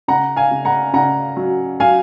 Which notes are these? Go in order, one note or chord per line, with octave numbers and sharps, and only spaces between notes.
C#3 F#5 A#5
F5 G#5
C#3
F#5 A#5
C#3 F#5 A#5
F#3
F#3 F5 G#5